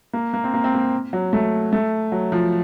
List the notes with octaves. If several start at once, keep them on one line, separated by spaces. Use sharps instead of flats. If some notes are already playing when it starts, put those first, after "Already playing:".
A#3
A#3
C4
A#3
C4
A#3
F#3
A3
A3
F#3
F3